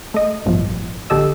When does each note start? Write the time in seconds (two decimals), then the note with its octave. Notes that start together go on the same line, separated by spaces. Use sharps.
0.14 A3 D#5
0.46 A1 G2 B2 F3
1.10 A#1 D3 G4 A4 D#5 E6